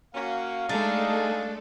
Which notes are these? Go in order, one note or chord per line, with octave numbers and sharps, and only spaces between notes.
A#3 C#4 F#4 F5
G#3 A3 D4 D#4 G#4 A4